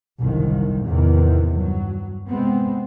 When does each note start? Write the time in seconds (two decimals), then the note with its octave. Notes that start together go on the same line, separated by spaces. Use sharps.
0.20 G1 C2 F#2 A2 D#3
0.86 A1 E2 A2 C3 D#3 E3
1.56 G2 F#3
2.27 C3 G#3 B3 C4